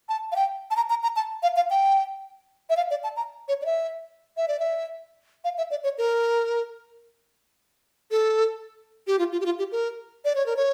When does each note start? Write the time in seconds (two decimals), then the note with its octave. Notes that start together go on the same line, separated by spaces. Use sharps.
0.09 A5
0.32 F5
0.36 G5
0.71 A5
0.76 A#5
0.90 A#5
1.03 A#5
1.16 A5
1.43 F5
1.56 F5
1.70 G5
2.70 E5
2.77 F5
2.91 D5
3.04 A5
3.16 A#5
3.48 C#5
3.62 D5
3.66 E5
4.37 E5
4.48 D5
4.60 E5
5.44 F5
5.58 E5
5.71 D5
5.84 C#5
5.98 A#4
8.11 A4
9.07 G4
9.19 F4
9.32 F4
9.41 G4
9.46 F4
9.59 G4
9.72 A#4
10.25 D5
10.35 C#5
10.46 A#4
10.57 C#5